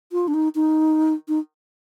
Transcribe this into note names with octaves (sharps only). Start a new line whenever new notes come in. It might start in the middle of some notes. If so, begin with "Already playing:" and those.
F4
D4
D#4
D#4
D#4